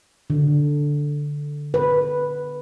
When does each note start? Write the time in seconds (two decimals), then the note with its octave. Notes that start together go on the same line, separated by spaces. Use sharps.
0.30 D3
1.74 B4